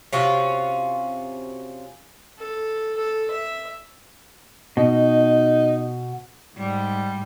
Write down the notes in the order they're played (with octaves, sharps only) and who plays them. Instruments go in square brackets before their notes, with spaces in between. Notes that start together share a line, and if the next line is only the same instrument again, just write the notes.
[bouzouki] C3 C#4 F4 F#4
[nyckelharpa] A4
A4
E5
[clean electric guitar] B2 [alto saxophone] D#4
[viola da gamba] G#2 G3